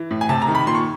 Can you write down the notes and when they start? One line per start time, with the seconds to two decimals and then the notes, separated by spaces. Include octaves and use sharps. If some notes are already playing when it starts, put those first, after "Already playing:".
Already playing: E3
0.11 A2
0.21 G#5
0.29 C3 A5
0.42 A#5
0.48 D#3
0.55 B5
0.67 A#2 C6
0.75 C#6